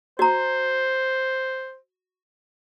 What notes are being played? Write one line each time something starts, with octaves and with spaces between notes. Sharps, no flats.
F#4 C5 A#5